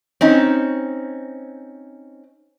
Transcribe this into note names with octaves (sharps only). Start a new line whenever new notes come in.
C4 C#4 D#4